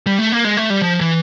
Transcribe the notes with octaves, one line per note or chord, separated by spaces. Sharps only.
G3
A3
A#3
G#3
A3
G3
F3
E3